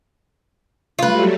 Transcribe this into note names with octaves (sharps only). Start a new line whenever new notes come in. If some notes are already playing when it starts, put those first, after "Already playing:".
F#3 G3 A3 F4 B4